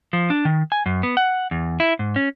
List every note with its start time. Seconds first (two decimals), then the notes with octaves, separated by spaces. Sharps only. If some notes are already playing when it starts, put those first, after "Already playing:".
0.13 F3
0.30 D4
0.45 D#3
0.72 G#5
0.86 F#2
1.03 B3
1.17 F#5
1.51 E2
1.80 E4
1.99 G#2
2.16 C#4